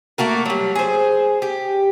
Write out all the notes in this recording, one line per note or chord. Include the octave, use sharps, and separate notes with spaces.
A3 A#3 F#4 A#4
F#3 G3
G#4 C5
G4